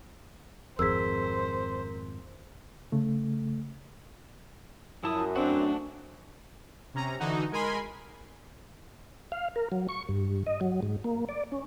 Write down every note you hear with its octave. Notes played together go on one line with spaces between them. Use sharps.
G#1 F2 G#4 A#4 C5 E6 B6
C#3 A3
F#2 F3 E4 A5 D#6
A3 C4 D4 F#4
C3 C#4 A#5
D3 E3 D#4 F#4
G#3 A#4 G#5 B5 C6
F5
A#4
F#3
C#6
G2
D#5
F#3
G#2
A#3
D5
C#4